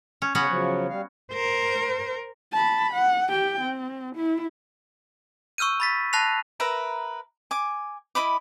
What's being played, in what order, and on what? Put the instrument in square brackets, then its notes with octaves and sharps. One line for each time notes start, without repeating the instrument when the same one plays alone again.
[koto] C#4
[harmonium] C#3 [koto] B3 C#4 F#4
[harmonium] C#3 F3 F#3
G3 F5
[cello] A#4 C5
[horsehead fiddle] A5 B5
F#5
G4 G5
C4
E4
[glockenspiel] C#6 E6 F6 G6 D#7
B5 A6 B6
A5 B5 F#6 A#6 C7 F7
[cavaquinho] A#4 B4 E5 A#5
G#5 D6
E4 D#5 B5 D6